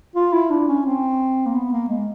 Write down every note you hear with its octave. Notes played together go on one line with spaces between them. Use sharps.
F4
E4
D4
C#4
C4
A#3
B3
A#3
G#3